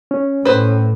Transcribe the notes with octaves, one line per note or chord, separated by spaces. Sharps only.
C#4
A2 B4 C5